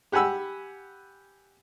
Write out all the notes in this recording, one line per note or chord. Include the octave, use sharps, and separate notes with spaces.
G4 F#5 G#5 B5 E6